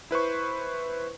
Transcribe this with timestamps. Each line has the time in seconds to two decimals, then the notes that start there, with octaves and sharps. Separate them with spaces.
0.11 E4 B4 C5 C#6